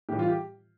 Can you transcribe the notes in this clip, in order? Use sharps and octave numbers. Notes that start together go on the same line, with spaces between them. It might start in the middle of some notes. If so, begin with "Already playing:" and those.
A2 E3 G3 G4
F4
G4